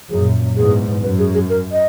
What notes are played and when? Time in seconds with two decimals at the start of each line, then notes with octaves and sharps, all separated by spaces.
0.10 F#2 A#2 G#4
0.56 E2 G#2 G#4
1.03 F#2 B4
1.19 G#4
1.34 G#4
1.49 A#4
1.72 D#5